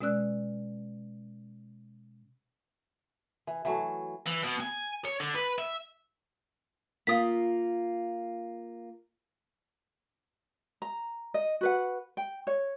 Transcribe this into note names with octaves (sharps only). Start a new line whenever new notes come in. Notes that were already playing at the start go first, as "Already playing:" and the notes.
B2 G#3 C#4 D5 E6 F#6
E3
E3 F#3 A3
E3
B2
G#5
C#5
D3
B4
E5
A#3 F4 F5 D#6 B6
A#5
D#5
F#4 B4 F#5
G5
C#5